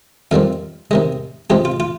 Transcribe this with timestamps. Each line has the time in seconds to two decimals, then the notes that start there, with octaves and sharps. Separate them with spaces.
0.31 F2 D#3 G3 C4 F5
0.91 C3 D#3 G#3 D#5
1.50 C3 F3 G#3 C4 G4
1.65 F4
1.80 F4